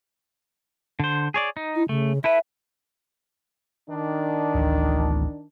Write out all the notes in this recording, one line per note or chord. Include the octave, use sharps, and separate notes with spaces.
D3 C5
G#4 C#5 D5
D#4
E4
C#3 A3
E4 A4 B4 E5
D#3 D4
D1 A1